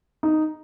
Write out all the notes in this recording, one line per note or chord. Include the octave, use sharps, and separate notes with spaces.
D#4